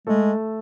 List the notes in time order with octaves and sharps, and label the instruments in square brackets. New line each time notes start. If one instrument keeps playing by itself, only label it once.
[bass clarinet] G#3 [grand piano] A3 A4